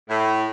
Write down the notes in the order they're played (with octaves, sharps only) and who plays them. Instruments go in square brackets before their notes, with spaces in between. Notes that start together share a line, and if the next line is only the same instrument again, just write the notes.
[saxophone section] A2